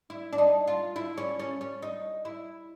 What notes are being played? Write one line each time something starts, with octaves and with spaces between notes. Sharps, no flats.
E4
D4
D#4
F4
E4
C#4
C#4
C#4
D#4
E4